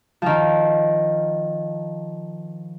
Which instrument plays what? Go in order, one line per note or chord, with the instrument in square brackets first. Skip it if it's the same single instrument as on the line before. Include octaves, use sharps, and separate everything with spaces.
[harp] D#3 F3